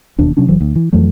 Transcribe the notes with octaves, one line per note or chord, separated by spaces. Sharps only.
E1 D#2 B2 D4
C3 F#3 C#4 D4
F1 E3 F#3
D2
E3
F2 E3 F#3 A3